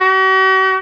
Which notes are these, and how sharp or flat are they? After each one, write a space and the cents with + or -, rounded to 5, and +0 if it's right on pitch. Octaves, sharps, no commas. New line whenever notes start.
F#4 +45